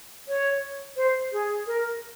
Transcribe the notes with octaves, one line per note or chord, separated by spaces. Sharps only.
C#5
C5
G#4
A#4